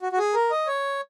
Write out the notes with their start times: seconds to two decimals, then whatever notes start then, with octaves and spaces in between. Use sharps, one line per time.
0.02 F#4
0.12 F#4
0.18 G#4
0.34 A#4
0.51 D#5
0.67 C#5